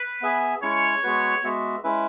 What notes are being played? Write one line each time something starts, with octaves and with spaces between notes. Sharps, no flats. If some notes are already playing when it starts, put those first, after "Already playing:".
Already playing: B4
B3 G#4 E5 G#5
G#3 C#4 E4 C#5
G#3 B3 F#4 B4
G#3 B3 F#4 E5
G#3 C#4 E4 B4 E5